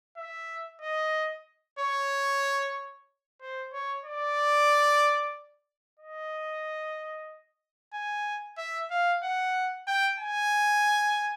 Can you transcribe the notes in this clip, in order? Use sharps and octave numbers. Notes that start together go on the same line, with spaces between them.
E5
D#5
C#5
C5
C#5
D5
D#5
G#5
E5
F5
F#5
G5
G#5